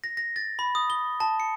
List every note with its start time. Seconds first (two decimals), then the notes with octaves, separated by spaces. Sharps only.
0.04 A#6
0.17 A#6
0.36 A6
0.59 B5
0.75 D#6
0.90 G7
1.20 A5
1.40 C#7